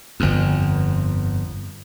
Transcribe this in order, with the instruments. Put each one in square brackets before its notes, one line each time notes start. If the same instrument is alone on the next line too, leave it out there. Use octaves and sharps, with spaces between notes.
[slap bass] G1 F2